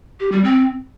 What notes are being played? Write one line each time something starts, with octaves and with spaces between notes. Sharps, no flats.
G4
G3
C4